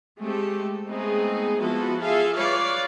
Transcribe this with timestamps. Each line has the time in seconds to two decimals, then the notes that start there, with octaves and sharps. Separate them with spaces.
0.18 G#3 A3 C4 G4 A4
0.88 G#3 A3 B3 C4 D#4 G#4
1.60 F3 G#3 B3 E4 F#4 A4
2.02 F4 G#4 A4 E5 F5
2.36 F4 B4 C#5 D5 F5